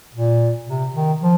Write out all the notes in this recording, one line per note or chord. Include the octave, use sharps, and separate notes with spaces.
A#2
C3
D#3
F3